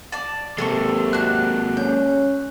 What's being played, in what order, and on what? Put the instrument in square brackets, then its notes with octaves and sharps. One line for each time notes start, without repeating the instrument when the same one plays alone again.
[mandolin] D5 A5
[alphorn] C3 [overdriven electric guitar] G#3 A#3 [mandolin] A4 C6 C#6
[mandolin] D4 F#4 [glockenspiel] F#6
[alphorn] C#4 [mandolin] G6